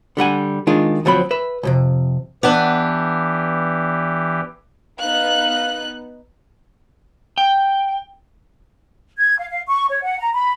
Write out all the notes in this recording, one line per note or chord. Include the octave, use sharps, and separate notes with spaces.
D3 G3 F#5 G#5
D#3 G#3 D4 F4
D2 F3 F#3 C4 B5
B4 E5
C2 F2 C3
E3 B3 D4 G4
B3 D#4 F5 F#6
G5
G#6
F5
F5
C#6
C#5
F#5
A#5
B5